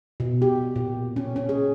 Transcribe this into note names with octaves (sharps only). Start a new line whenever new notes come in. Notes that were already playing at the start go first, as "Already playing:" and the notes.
B2
G4
A#2
C#4
C#4
G#4